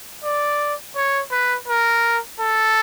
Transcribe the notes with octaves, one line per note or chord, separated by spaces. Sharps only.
D5
C#5
B4
A#4
A4